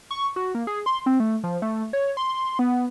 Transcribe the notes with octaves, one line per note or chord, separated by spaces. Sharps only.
C#6
F#4
A#3
G#4
C6
C4
A3
F3
A3
C#5
C6
B3